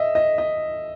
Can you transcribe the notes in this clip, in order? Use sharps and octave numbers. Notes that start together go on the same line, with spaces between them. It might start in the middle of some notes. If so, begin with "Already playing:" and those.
Already playing: D#5 E5
D#5
D#5